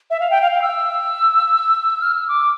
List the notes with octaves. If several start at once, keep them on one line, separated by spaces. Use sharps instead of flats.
E5
F5
G5
F5
F5
E6
F6
E6
D6